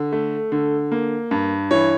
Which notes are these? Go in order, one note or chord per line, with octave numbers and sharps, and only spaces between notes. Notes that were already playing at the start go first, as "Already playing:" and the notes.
Already playing: D3
A3
D3
A#3
G2
E3 C#5